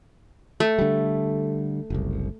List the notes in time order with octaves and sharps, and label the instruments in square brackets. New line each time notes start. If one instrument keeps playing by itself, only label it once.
[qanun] A3
[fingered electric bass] D3 G3
F#1 C2